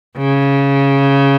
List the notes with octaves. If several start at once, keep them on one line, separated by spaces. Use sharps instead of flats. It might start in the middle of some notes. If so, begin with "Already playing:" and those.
C#3